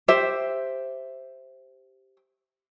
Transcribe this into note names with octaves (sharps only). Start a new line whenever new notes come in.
G4 C5 E5